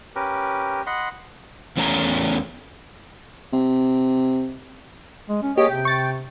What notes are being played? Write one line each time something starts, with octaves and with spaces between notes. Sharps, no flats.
C#4 G4 A#4 B4
D#5 F#5 B5 C6
E2 A3 C#4 A5 A#5
C3
G#3
C#4
A#3 G4 G#4 C#5 D#5
C3 G5
C#6 A6